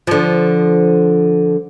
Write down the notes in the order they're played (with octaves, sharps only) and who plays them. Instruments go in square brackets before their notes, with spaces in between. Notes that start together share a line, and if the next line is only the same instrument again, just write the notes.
[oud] D3 F3